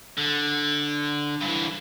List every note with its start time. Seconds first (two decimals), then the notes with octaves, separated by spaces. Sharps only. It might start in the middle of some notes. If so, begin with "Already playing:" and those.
0.17 D3
1.41 G2 E3